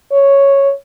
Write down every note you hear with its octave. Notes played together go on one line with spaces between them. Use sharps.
C#5